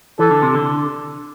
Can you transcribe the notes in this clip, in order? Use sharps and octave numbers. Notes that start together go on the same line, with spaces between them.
E3 A4
D3
C3
D3